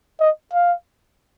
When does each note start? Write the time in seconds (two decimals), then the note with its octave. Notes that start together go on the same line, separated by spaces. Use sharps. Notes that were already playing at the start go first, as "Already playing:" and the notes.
0.20 D#5
0.53 F5